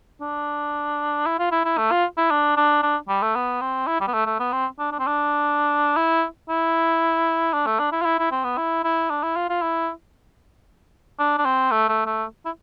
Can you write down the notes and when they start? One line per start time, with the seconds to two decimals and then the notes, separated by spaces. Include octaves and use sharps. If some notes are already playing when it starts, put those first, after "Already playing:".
0.21 D4
1.26 E4
1.39 F4
1.51 E4
1.65 E4
1.78 A3
1.91 F4
2.17 E4
2.31 D4
2.57 D4
2.83 D4
3.09 G3
3.22 A3
3.35 B3
3.61 C4
3.87 E4
4.01 G3
4.07 B3
4.13 A3
4.26 A3
4.39 B3
4.52 C4
4.79 D4
4.92 D4
4.99 C4
5.06 D4
5.96 E4
6.49 E4
7.53 D4
7.66 A3
7.79 D4
7.92 E4
8.01 F4
8.05 E4
8.19 E4
8.31 C4
8.44 B3
8.58 E4
8.84 E4
9.10 D4
9.23 E4
9.36 F4
9.49 F4
9.62 E4
11.19 D4
11.38 D4
11.45 C4
11.71 A3
11.89 A3
12.06 A3
12.45 E4